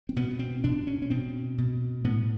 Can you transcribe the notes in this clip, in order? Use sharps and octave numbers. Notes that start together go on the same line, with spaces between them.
C4
B2 B3
C4
B2 D4
C#4
C#4
B2 C4
B2
A2 B3